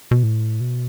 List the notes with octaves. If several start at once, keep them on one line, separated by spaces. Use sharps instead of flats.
B2
A2
B2